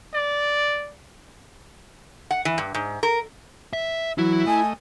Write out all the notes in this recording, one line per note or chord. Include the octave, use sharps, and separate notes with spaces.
D5
F#5
E3
G2
G#2
A#4
E5
E3 F#3 E4
A3 D#5 G#5